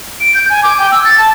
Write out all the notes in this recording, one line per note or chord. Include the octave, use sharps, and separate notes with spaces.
D7
G6
G#5
D6
G5
E6
A6
A5